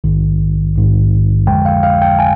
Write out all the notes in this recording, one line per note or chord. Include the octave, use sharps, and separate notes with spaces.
A#1 G#2 D#3
A#1 G#2 D#3
F2 D3 F3 G#3 G5
F5
F5
G5
G#5